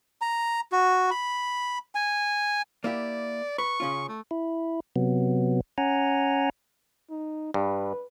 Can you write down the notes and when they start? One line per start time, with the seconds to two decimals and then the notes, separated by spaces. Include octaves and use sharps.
0.22 A#5
0.72 F#4
1.11 B5
1.95 G#5
2.84 A#3 E4 G4 D5
3.58 B4 C#6
3.80 C#3 C#4 F4
4.09 A3
4.31 E4
4.96 C3 F#3 B3
5.78 C#4 F#5 G#5 A#5
7.10 D#4
7.54 G2 B4